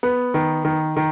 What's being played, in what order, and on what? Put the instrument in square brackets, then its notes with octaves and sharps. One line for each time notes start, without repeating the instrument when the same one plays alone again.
[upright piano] B3
D#3
D#3
D#3